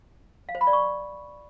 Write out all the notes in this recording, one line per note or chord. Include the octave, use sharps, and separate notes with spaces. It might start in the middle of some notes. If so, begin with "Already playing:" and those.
F5
C5
B5
D5
C#6